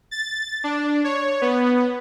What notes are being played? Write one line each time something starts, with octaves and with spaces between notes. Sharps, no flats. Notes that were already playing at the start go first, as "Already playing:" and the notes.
A6
D4
C#5
B3